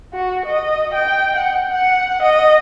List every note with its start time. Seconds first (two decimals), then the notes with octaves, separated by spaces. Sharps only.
0.13 F#4
0.46 D#5
0.94 G5
1.36 F#5
1.71 F#5
2.23 D#5